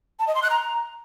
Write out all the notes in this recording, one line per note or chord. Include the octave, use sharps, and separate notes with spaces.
A5
D#5
C6
F#6
A#5